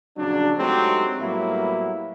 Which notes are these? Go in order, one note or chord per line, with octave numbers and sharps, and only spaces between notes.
A#1 C#3 F#3 D4
F#3 G#3 A3 C4 D#4 G4
A2 F#3 G3 A#3 B3 E4